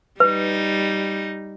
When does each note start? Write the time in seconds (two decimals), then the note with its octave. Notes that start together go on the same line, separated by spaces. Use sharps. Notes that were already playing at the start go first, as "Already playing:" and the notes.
0.20 G3 D#4 B4